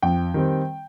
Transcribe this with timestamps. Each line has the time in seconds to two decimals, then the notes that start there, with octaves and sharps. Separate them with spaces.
0.03 F2 G5
0.34 D#3 G3 C4